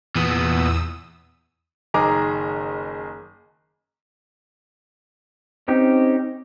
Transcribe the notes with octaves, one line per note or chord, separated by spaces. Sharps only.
E2 A#2 B3 D#6 E6
F#1 D#3 G#4 D#5 A#5 D6
C4 C#4 D#4 G4